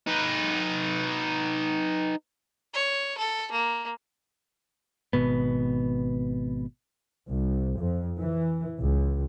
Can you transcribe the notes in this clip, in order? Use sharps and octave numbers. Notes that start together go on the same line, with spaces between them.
D#4 B4
C#5
A4
A#3
G#1 B2 B3
C2
F2
E3
C#2